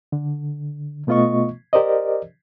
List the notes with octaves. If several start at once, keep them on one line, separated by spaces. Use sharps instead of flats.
D3
B2 A3 B3 F4 D#5 C#6
G4 A#4 C5 D5 D#5